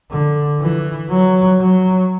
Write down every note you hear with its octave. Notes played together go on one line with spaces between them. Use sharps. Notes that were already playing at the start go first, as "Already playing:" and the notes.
D3
E3
F#3
F#3